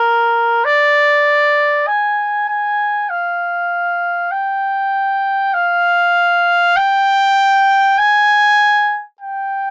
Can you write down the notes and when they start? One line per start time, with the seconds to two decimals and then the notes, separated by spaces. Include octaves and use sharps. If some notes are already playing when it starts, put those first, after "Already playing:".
Already playing: A#4
0.65 D5
1.87 G#5
2.48 G#5
3.10 F5
4.31 G5
5.54 F5
6.76 G5
7.99 G#5
9.21 G5